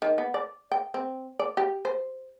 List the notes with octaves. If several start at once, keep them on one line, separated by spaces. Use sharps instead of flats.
D#3
B3
D5
G5
C4
D5
G4
C5